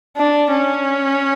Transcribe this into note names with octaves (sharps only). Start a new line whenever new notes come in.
D4
C#4